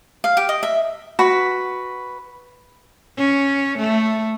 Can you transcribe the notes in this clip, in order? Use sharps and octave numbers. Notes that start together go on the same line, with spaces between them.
F5
G4
D#5
E5
F#4 B4 B5
C#4
A3